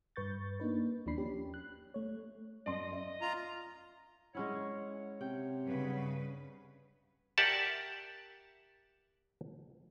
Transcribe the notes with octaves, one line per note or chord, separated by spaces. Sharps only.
G2 B4 C#6 G6 A6
A#3 D4 D#4 B4
D#2 F3 A#3 D4 B5 C7
C#4 G4
F#6
A3 C#5
F#2 D5 D#5 C6
D5 E5
F4 A#5
G#3 C#4 E4 C#5 F#5
C3 G5
G2 C#3 B4
G4 A#4 D5 E5 F#5 A5